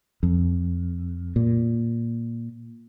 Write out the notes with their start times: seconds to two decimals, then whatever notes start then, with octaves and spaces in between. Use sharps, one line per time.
0.23 F2
1.36 A#2